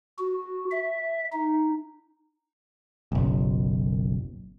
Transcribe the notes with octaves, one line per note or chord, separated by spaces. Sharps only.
F#4
E5
D#4
F#1 B1